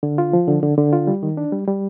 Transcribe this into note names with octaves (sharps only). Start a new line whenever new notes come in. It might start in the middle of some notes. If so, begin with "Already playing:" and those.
D3
F4
F3
D3
D3
D3
F4
G3
D#3
D4
G3
G3